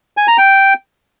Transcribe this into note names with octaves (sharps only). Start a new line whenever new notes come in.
G#5
A#5
G5